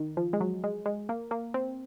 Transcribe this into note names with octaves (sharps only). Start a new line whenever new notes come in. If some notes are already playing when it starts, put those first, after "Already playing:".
Already playing: D#3
F3
G#3
F#3
G#3
G#3
A#3
A#3
C4